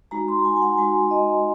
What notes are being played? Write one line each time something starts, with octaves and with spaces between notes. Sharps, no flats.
G#3 D#4 F#4 A#5
C6
A#5
G#5
G#5
F#5
G#3 D#4 F#4 G#5
D#5